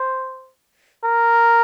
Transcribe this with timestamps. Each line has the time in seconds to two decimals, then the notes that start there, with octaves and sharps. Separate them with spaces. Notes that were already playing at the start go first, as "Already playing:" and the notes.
Already playing: C5
1.04 A#4